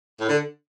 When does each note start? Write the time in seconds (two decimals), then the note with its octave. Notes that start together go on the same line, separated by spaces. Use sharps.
0.21 A2
0.29 D3